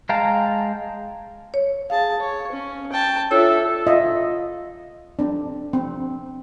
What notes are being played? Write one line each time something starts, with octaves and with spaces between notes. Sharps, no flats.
G#3 F5 G5 A5 A#5
C#5
G#4 F5 A5
C#5
C#4
G5 A5
D4 F4 A4 C#5 E5
F4 D#5 E5
C4 D4
C4